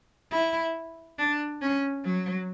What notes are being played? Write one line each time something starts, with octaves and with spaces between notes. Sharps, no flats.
E4
D4
C#4
F#3